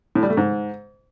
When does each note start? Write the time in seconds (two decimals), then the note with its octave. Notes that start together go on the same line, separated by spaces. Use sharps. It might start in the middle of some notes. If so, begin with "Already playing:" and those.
0.15 A2
0.23 G3
0.30 A3
0.37 G#2